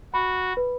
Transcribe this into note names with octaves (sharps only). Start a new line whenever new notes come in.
F#4 B5
B4